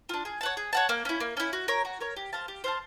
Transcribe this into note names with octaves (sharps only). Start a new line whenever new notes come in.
D4 F4
G#4
C#5 F#5 A5
G#4
C#5 F#5 A5
A#3
C#4 E4
A#3
C#4 E4
F#4
A#4 C#5
F#4
A#4 C#5
G4
C5 F5 A5
G4
C5 F5 A5